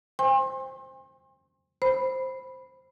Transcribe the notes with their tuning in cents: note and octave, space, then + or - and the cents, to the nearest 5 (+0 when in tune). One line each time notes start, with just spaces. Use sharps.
C5 +0 G5 +45 C6 +40
C5 +0 B5 +0